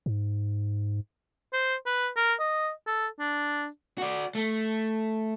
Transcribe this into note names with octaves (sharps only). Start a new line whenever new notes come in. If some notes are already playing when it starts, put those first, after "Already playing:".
G#2
C5
B4
A#4
D#5
A4
D4
F#4 D5
A3